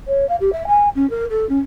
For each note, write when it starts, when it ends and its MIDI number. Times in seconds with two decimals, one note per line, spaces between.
0.07 0.27 73
0.29 0.36 77
0.40 0.50 67
0.52 0.66 76
0.67 0.89 80
0.95 1.09 61
1.10 1.25 70
1.30 1.48 69
1.49 1.58 61